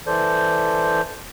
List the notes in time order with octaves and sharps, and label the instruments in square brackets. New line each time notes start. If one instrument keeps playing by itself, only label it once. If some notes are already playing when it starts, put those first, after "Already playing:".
[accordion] E3 A4 C5 D5 G6